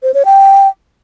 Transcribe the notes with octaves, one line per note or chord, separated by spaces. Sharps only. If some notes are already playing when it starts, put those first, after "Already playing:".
C5
C#5
G5